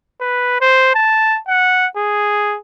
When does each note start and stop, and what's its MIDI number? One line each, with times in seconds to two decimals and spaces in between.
0.21 0.58 71
0.61 0.91 72
0.95 1.38 81
1.48 1.87 78
1.97 2.57 68